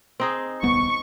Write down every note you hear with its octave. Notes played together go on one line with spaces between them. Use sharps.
C4 D#4 G#4
D#1 C2 B3 C#6